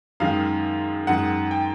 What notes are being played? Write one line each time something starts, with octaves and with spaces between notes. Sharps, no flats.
F#2 D#3 G#3 F5
F#2 D#3 G#3 F#5
G5